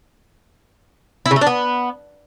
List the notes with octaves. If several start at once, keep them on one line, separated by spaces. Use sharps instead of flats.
E4
C#3
A3
D4
B3